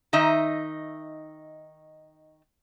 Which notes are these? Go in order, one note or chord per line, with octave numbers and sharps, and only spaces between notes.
D#3 D#4 D#5 E5